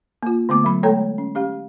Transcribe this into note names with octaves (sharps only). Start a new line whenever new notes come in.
A#3 F4
D3 A3 B3 D6
F#3 B5
G#3 A3 A4 C#5 G5 A#5
C#4
C#4 G4 F5